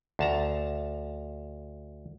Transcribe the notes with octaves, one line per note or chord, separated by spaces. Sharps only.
D2 A5 A#5